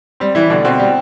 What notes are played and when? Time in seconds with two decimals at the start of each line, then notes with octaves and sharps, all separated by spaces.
0.20 G3 C4
0.35 E3 G3 E4
0.50 B2 D3 D4
0.65 B2 C4
0.80 G3